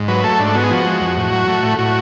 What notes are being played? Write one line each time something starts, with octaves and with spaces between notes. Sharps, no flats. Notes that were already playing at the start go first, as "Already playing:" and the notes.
Already playing: G#2
F#3 B4
A3 A4
G#2 D4
B3 F#4
G#4
F3 F#4
G#3
F2
A2
F#3
A3
A2
A2 F#4